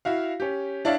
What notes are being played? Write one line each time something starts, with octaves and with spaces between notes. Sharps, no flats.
E4 F#4 F5
C#4 G4
D4 E4 C#5 D5 E5 F5